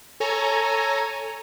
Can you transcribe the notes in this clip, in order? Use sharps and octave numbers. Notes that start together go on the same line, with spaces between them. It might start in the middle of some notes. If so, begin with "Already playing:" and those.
A4 C#5 G#5 A#5